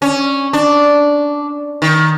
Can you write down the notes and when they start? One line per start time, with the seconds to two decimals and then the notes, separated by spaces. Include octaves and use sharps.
0.02 C#4
0.53 D4
1.82 D#3